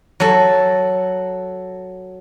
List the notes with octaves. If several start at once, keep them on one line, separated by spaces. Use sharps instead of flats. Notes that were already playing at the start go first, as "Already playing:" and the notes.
F#3 A4